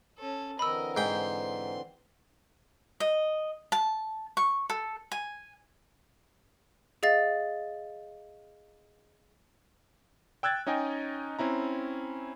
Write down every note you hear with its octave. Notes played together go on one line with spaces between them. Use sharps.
C#4 A4
D3 E3 C4 A#4 D#5 B5 E6
G#2 G5 C6
D#5
A5
C#6
A4
G#5
G#4 D#5 F5 A6
G5 E6 F#6 G#6 A6
C#4 D#4 D#5 G5 G#5
C4 C#4 E4 A#5